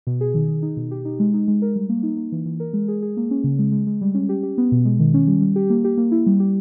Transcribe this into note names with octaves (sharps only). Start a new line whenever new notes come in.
B2
G#4
D#3
D#3
D#4
B2
G4
D#4
G#3
D#4
G#3
A#4
G3
A#3
D#4
A#3
E3
E3
A#4
G#3
G#4
G#4
A#3
C#4
C#3
G#3
G#3
G#3
G3
C#4
G4
G4
B3
B2
G#3
D#3
C#4
G3
G3
G4
A#3
G4
A#3
E4
G3
G4